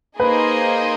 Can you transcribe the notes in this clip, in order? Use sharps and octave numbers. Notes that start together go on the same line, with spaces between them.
A#3 D#4 G#4 B4 C5 D#5